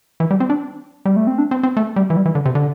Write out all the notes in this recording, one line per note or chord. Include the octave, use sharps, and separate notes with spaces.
E3
G3
C4
D4
G3
A3
C4
D4
C4
C4
A3
G3
E3
G3
E3
D3
C3
D3